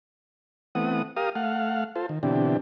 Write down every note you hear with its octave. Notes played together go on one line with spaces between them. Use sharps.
E3 A3 B3 C4 F#5 D#6
G4 A#4 F5 D#6
A3 F5 F#5
F4 A4 C5
D#3
B2 D3 E3 C4 D4 G4